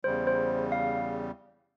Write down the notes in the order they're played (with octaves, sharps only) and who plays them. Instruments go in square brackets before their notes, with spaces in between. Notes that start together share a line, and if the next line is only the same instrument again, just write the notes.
[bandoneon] E2 C#3 G3 [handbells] C5
[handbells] C5
F5